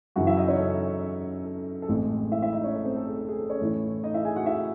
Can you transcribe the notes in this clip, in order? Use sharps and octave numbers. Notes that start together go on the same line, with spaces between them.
F#2 C#3 E3 F#4 F#5
E4 E5
D#4 D#5
C#4 C#5
A4
A4
A4
A1 A2 G#3 C4 E4 G#4
E4 E5
E4 E5
D#4 D#5
C#4 C#5
A4
C4 C5
A4
G#4
A4
G#4
A4
C#4 C#5
A2 E3 A3 C#4 E4
D#4 D#5
E4 E5
G#4 G#5
F#4 F#5
E4 E5